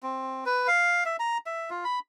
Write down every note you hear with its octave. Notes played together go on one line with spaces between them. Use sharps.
C4
B4
F5
E5
A#5
E5
F4
B5